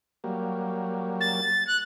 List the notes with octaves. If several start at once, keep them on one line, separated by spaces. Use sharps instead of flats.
F#3 G3 A#3
A6
F#6